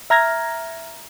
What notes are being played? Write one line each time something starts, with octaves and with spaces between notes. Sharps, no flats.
E5 A#5 F6 G#6 A#6